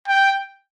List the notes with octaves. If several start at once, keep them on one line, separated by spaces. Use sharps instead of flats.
G5